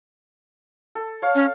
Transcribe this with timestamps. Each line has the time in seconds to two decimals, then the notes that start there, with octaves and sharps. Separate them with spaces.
0.95 A4
1.22 C#5 F5
1.35 C#4